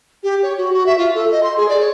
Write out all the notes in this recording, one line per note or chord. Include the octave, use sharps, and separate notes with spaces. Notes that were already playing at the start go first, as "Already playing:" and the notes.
G4
C#5
F#4
F#4
E5
F4
A4
D#5
C6
G#4
D5
C#5